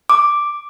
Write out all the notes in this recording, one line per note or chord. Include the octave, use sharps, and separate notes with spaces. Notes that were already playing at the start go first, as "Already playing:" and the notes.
D6